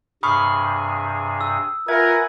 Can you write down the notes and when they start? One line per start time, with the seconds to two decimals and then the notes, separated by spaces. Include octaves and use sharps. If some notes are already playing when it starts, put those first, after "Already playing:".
0.23 G2 C3 G#4 B5 C#6 D#6 F6
1.41 E6
1.88 F4 A#4 B4 E5 F#5 G#5 G#6